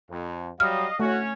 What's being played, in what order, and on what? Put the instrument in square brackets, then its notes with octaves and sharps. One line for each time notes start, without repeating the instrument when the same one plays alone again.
[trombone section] F2
[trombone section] F#3 G3 [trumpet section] D#5 F5 [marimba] F6
[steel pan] A3 [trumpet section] C#4 C#5 [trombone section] F#4